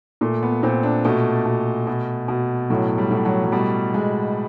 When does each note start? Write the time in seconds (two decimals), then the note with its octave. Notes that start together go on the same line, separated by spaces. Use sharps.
0.21 A#2 A3
0.43 B3
0.63 A#2 C4
0.83 D4
1.05 B2 A3
1.46 B2
1.87 B2
2.28 B2
2.70 A2 F#3
2.98 G3
3.11 A2
3.25 F#3
3.44 F#3
3.52 B2 G3
3.94 B2 G#3